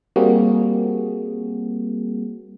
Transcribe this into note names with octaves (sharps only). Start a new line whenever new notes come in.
G3 A#3 C4 F#4 G#4